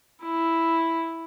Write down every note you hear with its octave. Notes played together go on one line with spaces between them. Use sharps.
E4